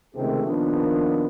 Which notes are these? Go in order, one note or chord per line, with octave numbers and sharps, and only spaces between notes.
C#2 C3 D#3 A3 C4 G#4
D#3 F3 A#3 B3 D4